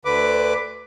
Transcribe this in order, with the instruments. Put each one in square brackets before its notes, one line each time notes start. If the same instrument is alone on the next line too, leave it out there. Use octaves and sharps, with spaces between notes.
[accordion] D2 D3 B4 D6